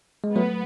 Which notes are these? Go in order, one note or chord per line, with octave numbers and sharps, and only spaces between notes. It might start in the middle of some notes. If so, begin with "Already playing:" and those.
G#3
F#3 A3 B3